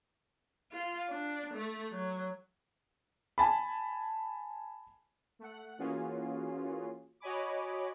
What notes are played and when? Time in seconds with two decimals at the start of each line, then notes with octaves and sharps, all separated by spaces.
0.72 F4
1.10 D4
1.54 A3
1.91 F#3
3.38 G#5 A5 B5
5.39 A3 F#5
5.79 E3 A#3 C#4 F4 F#4 G#4
7.20 F#4 C#5 D#5 G#5 B5 D6